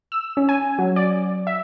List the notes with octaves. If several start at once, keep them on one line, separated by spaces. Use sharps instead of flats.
E6
C#4
G#5
F#3
D5
E5